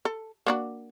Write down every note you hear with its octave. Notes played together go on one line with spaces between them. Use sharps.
A4
A#3 D4 F#4